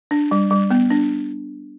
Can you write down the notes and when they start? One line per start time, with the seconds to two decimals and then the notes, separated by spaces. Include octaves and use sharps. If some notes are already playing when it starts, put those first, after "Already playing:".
0.11 D4
0.31 G3
0.51 G3
0.71 B3
0.90 D4